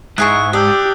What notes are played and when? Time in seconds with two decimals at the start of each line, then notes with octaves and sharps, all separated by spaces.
0.18 G#2 E4 G#4 C#6 F#6
0.53 D4 G4 D#6 E6 G6